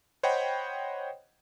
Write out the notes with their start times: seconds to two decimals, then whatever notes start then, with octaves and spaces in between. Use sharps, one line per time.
0.23 C5 C#5 D#5 F#5 G5 B5